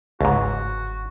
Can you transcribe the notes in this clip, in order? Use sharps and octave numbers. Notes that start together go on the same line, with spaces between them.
G1 C#2 G#2 F#4